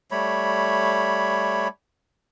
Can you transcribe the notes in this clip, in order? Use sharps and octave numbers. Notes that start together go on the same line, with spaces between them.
G3 A3 C#5 B5